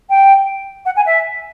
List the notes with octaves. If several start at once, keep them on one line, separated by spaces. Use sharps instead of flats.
G5
F#5
G#5
E5